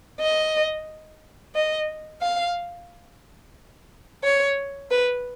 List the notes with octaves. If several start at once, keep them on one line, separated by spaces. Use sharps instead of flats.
D#5
D#5
F5
C#5
B4